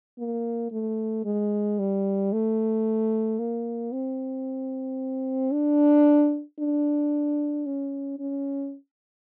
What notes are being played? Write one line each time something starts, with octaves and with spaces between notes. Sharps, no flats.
A#3
A3
G#3
G3
A3
A#3
C4
D4
D4
C#4
C#4